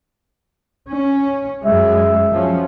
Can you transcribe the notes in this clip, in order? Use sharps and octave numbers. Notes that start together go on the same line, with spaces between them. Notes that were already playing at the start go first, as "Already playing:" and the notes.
C#4
F#2 G#3 E5
F3 F#3 C#4